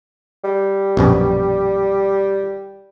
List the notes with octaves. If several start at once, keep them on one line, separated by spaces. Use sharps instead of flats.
G3
A#1 F#2 B2